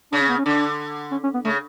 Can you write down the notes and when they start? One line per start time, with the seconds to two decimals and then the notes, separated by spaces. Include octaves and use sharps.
0.12 C#3 D4
0.21 C#4
0.29 B3
0.38 C#4
0.45 D3 D4
1.11 C#4
1.23 C#4
1.34 B3
1.45 C#3 A3